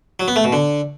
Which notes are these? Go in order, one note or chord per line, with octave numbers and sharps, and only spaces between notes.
F#3
B3
A3
B2
D3